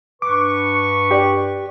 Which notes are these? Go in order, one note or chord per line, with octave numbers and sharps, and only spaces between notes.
G2 B4 C#6 D6
G4 D5